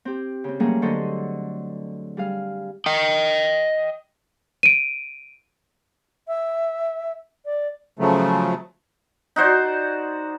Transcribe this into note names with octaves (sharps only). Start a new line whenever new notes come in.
C4 G4
C#3 C4
F#3 G3 A3 A#3 C#4 G#4
D3 F#3 A4 C5 D#5 C#6
G3 G#4 F5
D#5 G5
D7 D#7
E5
D5
C#3 F3 F#3 A3
D#4 F#4 C5 D5